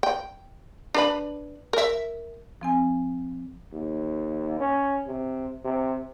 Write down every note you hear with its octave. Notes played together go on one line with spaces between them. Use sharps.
G5
D4 B4 B5
A#4 E5
F3 C4 G#5
D#2
C#4
C3
C3